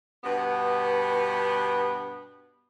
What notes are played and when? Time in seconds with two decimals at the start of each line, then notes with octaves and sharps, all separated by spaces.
0.23 G2 B2 B3